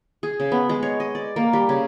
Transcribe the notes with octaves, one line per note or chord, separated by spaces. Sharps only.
G#4
C#3
B3
G#3
C#5
D#5
D5
A#3
G3
C#3